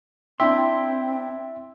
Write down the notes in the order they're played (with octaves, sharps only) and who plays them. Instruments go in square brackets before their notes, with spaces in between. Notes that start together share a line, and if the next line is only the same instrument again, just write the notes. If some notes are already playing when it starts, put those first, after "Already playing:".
[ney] C4 [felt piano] D4 E4 G5 [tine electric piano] E5 [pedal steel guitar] C6